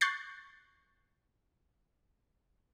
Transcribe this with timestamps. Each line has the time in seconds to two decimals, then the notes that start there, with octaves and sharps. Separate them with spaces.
0.01 C#6 F#6 G6 A6 C7